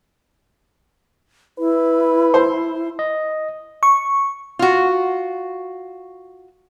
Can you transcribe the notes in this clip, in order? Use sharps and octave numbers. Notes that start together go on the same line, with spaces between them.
E4 B4
C5
D#5
C#6
F4 F#4